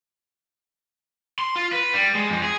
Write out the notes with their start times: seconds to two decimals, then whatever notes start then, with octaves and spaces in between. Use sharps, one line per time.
1.39 C6
1.56 F4
1.73 B4
1.93 G3
2.15 G#3
2.30 F2
2.43 G#4